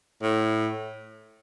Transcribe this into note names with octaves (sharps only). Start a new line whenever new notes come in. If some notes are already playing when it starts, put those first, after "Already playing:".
A2